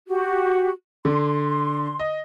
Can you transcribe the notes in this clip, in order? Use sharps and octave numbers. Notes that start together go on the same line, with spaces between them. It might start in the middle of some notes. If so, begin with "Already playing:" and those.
F#4 G4
D3 C6
D#5